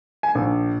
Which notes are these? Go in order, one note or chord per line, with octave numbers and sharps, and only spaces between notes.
G#5
A#1